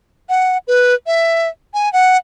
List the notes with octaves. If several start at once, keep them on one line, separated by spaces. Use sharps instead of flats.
F#5
B4
E5
G#5
F#5